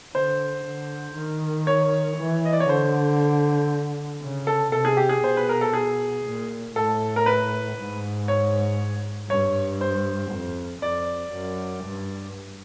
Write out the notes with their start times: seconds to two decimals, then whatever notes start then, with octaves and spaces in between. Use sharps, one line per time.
0.14 D3 C5
0.65 D3
1.16 D#3
1.67 C#5
2.18 E3
2.45 D#5
2.53 D5
2.60 C#5
2.69 D3 C5
4.22 C#3
4.47 A4
4.72 C3 A4
4.85 G#4
4.97 G4
5.09 G#4
5.23 B2 C5
5.37 B4
5.49 A#4
5.61 A4
5.73 G#4
6.25 A#2
6.75 A2 A4
7.16 A#4
7.26 B4
7.77 G#2
8.28 C#5
9.30 G2 C#5
9.81 C5
10.31 F2
10.82 F2 D5
11.32 F#2
11.84 G2